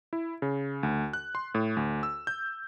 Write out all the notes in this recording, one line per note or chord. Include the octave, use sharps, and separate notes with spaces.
E4
C#3
D2
F#6
C6
A2
D2
E6
G6